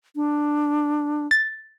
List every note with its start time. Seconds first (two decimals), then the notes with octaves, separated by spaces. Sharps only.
0.16 D4
1.31 A6